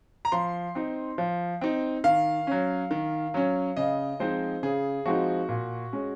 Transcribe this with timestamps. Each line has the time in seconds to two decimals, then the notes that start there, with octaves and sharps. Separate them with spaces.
0.25 A#5
0.32 F3 C6
0.75 C4 D#4
1.18 F3
1.61 C4 D#4
2.04 D#3 F5
2.47 F#3 C#4
2.91 D#3
3.34 F#3 C#4
3.77 C#3 D#5
4.19 F3 G#3 C4 D#4 C5
4.63 C#3 G#4
5.06 F3 G#3 C4 D#4 F#4
5.49 A#2
5.93 G#3 C#4